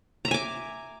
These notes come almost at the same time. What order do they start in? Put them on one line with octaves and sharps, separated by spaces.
A#5 E5 G#5 D6